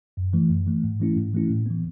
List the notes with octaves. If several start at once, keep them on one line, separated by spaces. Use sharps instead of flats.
F#2
E3 A3
F#2
E3 A3
G#2
E3 A3 C#4 E4
G#2
E3 A3 C#4 E4
A2
E3 B3